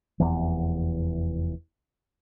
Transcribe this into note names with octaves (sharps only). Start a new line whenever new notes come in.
F1 E2 E3